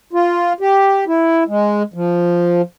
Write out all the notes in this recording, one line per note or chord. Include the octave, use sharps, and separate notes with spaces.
F4
G4
E4
G#3
F3